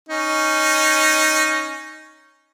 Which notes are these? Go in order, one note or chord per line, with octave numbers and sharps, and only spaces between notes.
C#4 D#4